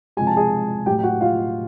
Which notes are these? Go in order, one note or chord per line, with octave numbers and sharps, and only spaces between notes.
C3 F3 G#3 G#5
A5
G#4 G#5
A2 F#3 G4 G5
G5
F#4 F#5
F4 F5